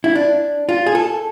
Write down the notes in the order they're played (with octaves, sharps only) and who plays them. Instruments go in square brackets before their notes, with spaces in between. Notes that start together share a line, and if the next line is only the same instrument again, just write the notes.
[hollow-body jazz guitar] E4
D4
F4
G#4
A4